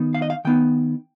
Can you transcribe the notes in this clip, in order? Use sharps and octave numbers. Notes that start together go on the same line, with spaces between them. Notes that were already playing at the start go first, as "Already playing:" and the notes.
Already playing: D#3 B3 D#4
F5
D#5
F5
D#3 B3 D#4 G5